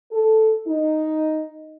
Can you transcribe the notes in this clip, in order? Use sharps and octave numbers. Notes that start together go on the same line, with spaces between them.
A4
D#4